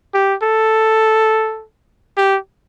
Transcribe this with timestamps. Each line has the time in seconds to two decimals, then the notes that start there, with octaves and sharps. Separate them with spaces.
0.14 G4
0.43 A4
2.17 G4